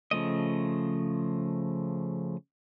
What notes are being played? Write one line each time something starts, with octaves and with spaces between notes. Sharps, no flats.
C#3 F3 A3 D#5